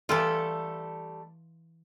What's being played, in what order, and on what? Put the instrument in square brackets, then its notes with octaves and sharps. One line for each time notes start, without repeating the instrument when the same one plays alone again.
[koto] E3 F4 [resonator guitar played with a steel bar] G3 A3 A4